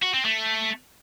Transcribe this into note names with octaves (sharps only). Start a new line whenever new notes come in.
F#4
C4
A3